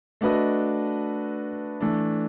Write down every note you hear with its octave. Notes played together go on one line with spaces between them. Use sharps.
A3 D4 F#4 B4 D#5
E3 A3 D4